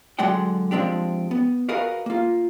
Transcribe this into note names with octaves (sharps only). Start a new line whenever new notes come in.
D3 F#3 G#3 D5 F#5 G5
F3 G#3 C4 D4 G4
B3
F#4 G#4 A#4 B4 D#5 F5
A#3 F4